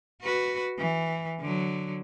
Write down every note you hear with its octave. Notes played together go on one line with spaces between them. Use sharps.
F#4 B4
E3
D3 F#3